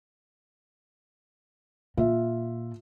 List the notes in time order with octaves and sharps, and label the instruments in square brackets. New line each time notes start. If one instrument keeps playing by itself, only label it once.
[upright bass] A#2 [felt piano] F4 E5